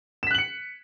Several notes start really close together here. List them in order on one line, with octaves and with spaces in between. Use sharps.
E7 B6 F#6 F#7 C#7